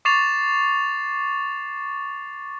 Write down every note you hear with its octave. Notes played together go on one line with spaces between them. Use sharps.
C#6 D6 A6 C7 E7 F7